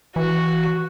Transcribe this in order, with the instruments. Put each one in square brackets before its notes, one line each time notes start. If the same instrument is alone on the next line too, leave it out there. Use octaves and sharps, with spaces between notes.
[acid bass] E3 [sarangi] F#4